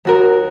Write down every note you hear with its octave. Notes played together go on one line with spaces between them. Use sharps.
D#2 F#4 A#4